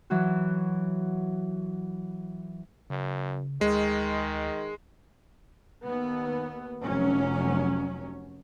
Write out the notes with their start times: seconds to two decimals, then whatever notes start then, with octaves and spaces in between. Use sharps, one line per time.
0.10 E3 F#3 F#4
2.90 F#2 C#3
3.61 D2 D#3 G#3
5.84 D#2 B3
6.82 F1 F#3 C#4